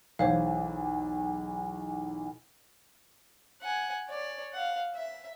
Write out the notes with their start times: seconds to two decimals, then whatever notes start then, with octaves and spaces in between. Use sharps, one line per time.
0.19 B1 E2 C5 C#5 F5
3.62 F#5 G#5
4.08 C#5 D5
4.53 F5 F#5
4.95 E5